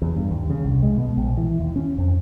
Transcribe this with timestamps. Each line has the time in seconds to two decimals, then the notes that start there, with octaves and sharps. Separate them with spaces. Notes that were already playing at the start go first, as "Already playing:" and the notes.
0.02 E2
0.16 G2
0.31 D#2
0.50 C#3
0.64 C2
0.82 G#3
0.97 B2
1.18 A#1
1.37 E3
1.60 D#2
1.76 C#4
1.98 F2